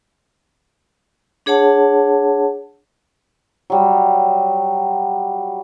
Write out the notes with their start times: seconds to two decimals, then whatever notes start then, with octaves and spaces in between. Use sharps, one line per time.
1.46 D4 G#4 C#5 F#5 A5
3.70 F#3 G3